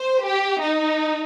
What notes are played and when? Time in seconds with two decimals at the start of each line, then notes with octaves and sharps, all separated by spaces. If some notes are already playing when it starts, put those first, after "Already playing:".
Already playing: C5
0.25 G4
0.61 D#4